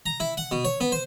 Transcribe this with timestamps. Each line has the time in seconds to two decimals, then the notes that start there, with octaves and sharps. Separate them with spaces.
0.06 A#5
0.20 E4
0.37 F#5
0.51 B2
0.65 C#5
0.80 B3
0.92 C5